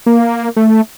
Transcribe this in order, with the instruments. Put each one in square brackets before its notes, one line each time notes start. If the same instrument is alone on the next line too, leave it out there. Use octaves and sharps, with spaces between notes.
[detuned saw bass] A#3
A3